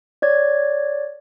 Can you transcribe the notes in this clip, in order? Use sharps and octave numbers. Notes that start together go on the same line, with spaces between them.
C#5 D5 G#6